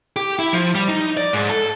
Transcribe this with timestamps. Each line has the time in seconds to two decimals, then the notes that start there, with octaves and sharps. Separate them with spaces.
0.16 G4
0.39 E4
0.53 F3
0.75 G3
0.89 D#4
1.17 D5
1.33 G#2
1.50 A4